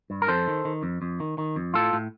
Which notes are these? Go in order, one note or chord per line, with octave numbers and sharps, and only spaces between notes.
G2
A#4
F2 A4 C5
D#3
D#3
F2
F2
D#3
D#3
F2
A2 F4 A4
A2